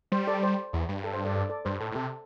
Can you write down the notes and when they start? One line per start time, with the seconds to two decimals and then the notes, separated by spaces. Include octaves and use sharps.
0.12 G3 C5
0.27 A4 D5
0.43 C5
0.73 E2
0.89 G2
1.04 A4
1.14 C5
1.25 A4 D5
1.35 A4 D5
1.49 A4 D5
1.65 G2 C5
1.80 A2 A4
1.91 A2
1.95 C3 A4